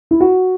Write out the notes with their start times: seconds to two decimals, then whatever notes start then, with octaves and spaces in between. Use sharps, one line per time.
0.11 E4
0.20 F#4